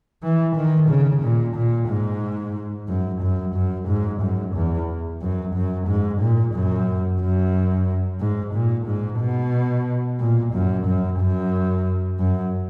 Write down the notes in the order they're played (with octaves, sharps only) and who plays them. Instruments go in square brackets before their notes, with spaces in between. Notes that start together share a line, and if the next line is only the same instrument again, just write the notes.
[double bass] E3
D#3
C#3
A#2
A#2
G#2
F#2
F#2
F#2
G#2
F#2
E2
F#2
F#2
G#2
A#2
F#2
F#2
G#2
A#2
G#2
B2
A#2
F#2
F#2
F#2
F#2